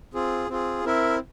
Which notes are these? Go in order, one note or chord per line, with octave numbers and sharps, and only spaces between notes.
C4 F4 G#4
C4 F4 G#4
C4 E4 A#4 E5